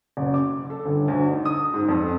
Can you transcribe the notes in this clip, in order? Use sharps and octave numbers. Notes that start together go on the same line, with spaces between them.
F#1
D6
A4
G1
D2
D#4
D#6
G#2
F2